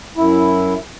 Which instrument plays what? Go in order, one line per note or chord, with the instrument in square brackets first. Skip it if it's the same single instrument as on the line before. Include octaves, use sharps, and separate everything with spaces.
[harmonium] F#2 E4